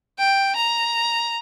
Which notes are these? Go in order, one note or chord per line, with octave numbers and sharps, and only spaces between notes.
G5
A#5